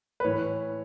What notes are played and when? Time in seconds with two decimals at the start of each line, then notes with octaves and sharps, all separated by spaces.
0.20 B4
0.24 A2 E3 C#5